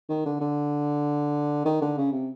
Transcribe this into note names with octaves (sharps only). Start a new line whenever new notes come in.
D#3
D3
D3
D#3
D3
C#3
C3